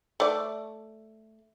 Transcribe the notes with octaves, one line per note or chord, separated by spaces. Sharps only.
A3 D5